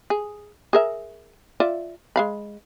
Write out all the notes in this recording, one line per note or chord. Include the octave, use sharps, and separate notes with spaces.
G#4
G#4 A#4 E5
F4 D5 E5
G#3 F5 B5